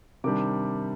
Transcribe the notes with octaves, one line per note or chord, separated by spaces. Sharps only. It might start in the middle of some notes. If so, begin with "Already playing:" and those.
C3 D#3 G3 D4 D6